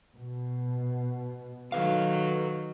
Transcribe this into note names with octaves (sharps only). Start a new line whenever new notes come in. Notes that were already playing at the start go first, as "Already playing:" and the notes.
B2
D#3 F#3 A4 B4 F5